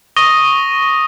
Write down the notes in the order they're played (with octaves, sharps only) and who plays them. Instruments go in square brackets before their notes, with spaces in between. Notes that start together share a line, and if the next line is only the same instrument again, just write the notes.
[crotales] C#6 D#6 A#6 D#7 G7